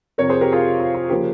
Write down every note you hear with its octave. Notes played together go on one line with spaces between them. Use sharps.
F2 C3 F3 C4 A#4 C#5
G#4 C5
G4 A#4
F4 G#4
F4
F4
C#3 F3 A#3 G4